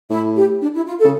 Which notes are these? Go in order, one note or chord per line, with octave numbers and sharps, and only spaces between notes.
A2 E4
G4
D4
E4
F4
A4
C#3